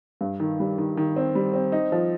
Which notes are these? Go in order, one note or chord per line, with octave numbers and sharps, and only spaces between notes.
G2
D#3
G3
D#3
D#3
C4
G3
C4
D#4
F3